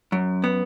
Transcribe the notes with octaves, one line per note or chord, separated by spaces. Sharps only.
F#2
B3